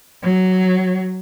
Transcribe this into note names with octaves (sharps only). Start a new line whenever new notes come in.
F#3